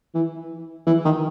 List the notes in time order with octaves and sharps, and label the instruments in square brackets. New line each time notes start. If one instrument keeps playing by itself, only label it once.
[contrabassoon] E3
E3
D#3